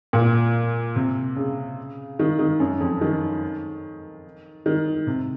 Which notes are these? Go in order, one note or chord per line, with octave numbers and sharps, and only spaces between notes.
A#2
C3
C#3
D#3
D#3
F#2
F2
D#3
D#3
C3